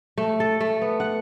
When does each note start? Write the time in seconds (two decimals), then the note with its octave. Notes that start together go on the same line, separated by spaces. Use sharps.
0.18 A3
0.40 A4
0.61 A3
0.82 B3
1.00 F#5